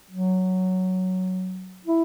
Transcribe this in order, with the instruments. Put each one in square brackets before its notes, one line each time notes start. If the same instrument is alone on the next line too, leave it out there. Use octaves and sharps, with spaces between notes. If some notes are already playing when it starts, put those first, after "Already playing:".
[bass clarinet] F#3
E4